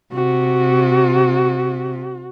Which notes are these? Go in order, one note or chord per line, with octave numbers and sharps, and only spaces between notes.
C3 F#4